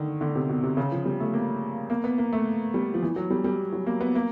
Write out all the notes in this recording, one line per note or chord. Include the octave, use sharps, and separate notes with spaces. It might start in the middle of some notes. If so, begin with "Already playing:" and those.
Already playing: D3 D#3
D3
C3
B2
C3
C#3
F3
G3
A3
A#3
A#3
B3
A#3
A3
G3
F3
E3
F#3
G3
G3
F#3
A#3
B3
A#3